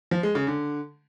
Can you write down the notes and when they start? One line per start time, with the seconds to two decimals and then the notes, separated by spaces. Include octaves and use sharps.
0.11 F3
0.23 G#3
0.35 C#3
0.47 D3